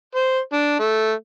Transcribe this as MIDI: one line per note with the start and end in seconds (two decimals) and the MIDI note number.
0.16 0.39 72
0.53 0.77 62
0.79 1.12 57